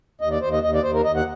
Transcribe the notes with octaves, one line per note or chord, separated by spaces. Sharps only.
D#2 D#5
D5
D#2 C5
D#5
D#2 D#5
D5
D#2 C5
A#4
D#2 D#5
F#5